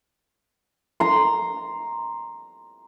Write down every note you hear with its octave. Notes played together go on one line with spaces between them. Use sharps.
A#5 C6